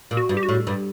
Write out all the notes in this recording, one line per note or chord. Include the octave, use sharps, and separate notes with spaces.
A#2
F#4
G2
G4
F#4
A2
G2